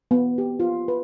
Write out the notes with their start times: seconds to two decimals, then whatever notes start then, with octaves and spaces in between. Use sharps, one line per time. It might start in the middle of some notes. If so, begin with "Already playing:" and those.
0.11 B3
0.38 G4
0.60 F4
0.88 B4